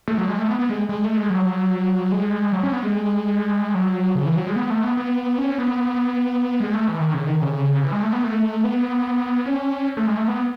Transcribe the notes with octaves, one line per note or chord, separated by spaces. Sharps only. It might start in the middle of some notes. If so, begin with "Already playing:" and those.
A3
F#3
G#3
A3
B3
B3
G#3
G#3
A3
G#3
F#3
G#3
F#3
C#4
B3
G#3
F#3
C#3
E3
F#3
G#3
B3
A3
B3
B3
C#4
B3
G#3
A3
E3
D#3
C#3
D#3
C#3
E3
G#3
A3
B3
A3
B3
C#4
A3
G#3
A3
B3